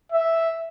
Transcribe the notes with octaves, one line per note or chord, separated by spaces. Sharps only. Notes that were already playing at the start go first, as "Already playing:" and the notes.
E5